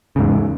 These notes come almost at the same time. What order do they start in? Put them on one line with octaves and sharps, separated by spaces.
C#3 G#2 E2